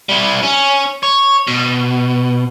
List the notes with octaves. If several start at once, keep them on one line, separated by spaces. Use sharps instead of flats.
G3 E4
C#4
C#5
B2